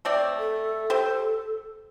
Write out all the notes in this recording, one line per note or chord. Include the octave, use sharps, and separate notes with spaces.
A3 C4 D5
A4
G4 C5